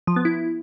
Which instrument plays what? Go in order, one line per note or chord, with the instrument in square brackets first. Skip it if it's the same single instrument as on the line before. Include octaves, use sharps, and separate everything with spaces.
[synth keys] F3
B3
E4